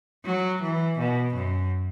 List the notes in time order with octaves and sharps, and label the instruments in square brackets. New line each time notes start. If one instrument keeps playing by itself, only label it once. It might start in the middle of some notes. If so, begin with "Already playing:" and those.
[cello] F#3
E3
B2
F#2